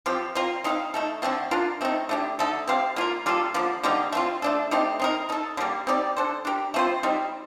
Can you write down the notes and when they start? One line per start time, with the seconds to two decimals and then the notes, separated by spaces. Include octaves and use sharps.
0.06 F3 C4 G4
0.35 C4 F4 A#4
0.64 C4 D#4 A#4 F5
0.94 A3 D#4 A4
1.22 D3 A3 C4 F4
1.51 D4 F4 A#4
1.81 A3 C4 D#4
2.09 A3 D4 G4
2.39 D3 A3 D#4 A4
2.67 C4 G4 C5 F5
2.96 A#3 F4 A#4
3.26 G3 A#3 F4 A4
3.54 D3 F3 A#3
3.83 D3 G3 A#3 D#4
4.12 A3 C4 F4
4.42 A3 D4 A4
4.71 A3 C4 D#4 G4
5.00 C4 D#4 A#4
5.29 A3 D#4 A4
5.57 D3
5.61 G3 A#3
5.87 C4 D#4 G4 D5
6.17 D4 A4 C5
6.45 D4 G4 A#4
6.74 A3 C4 F4 C5
7.03 G3 C4 D#4